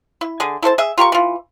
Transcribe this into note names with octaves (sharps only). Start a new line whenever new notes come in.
E4
D3 G#4
E4 A4 C5 A5
G#4 E5
F4 G4 A#4 C#6
E3 F4